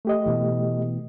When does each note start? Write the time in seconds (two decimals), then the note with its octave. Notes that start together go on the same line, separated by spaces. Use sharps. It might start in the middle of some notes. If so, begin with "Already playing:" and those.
0.05 A3 G4 D#5
0.26 B2 E3